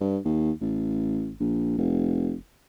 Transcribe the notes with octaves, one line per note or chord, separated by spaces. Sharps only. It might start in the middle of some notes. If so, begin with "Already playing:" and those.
G2
D#2
A1
A#1
F1